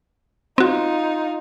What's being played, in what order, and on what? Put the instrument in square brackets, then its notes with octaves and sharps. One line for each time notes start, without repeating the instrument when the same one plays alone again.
[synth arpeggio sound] C4 F#4 [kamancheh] D#4 F4